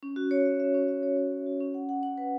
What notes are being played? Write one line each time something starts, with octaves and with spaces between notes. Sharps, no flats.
C#4
F#4
C#5
E5
E5
C#4
E5
C#5
C#5
C#5
F#4
C#4
F#5
F#5
F#5
B4